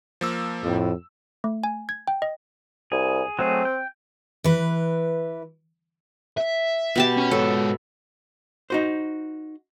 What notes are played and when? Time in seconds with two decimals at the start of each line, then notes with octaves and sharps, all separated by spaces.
0.21 F3 A#3 E6
0.63 F2 A2
1.44 A3
1.64 G#5
1.89 G#6
2.08 G5
2.22 D#5
2.92 C2 G#4
3.39 F#3 A3 C4 G#4
3.65 G5
4.44 E3 B4
6.38 E5
6.96 B2 G4 A5
7.17 C#4
7.31 G#2 A4 C#5
8.70 D#4 F#4 C5